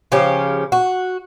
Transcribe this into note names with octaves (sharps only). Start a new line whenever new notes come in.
C#3 F3 C#4 G4
F#4